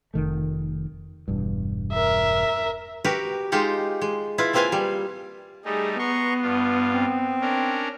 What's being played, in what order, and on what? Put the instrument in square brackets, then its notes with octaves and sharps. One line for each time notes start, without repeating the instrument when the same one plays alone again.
[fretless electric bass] F1 D#3 A3
E1 G2
[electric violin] A#4 E5
[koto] F#4 G4 A#4 B4
G#3 D#4 F4 G4 F#5
G#3
E4 F4 B4
A#3 C4 F4 B4 F5 G#5
G3
[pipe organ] G3 A3 D#4 [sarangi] G#4
[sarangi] B3 [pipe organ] A#5 C6 C#6
[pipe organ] G2 F4
[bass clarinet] C4
[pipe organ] C#4 D4 A#4